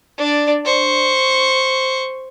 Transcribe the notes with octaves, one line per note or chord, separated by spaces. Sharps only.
D4 D5
C5 C#6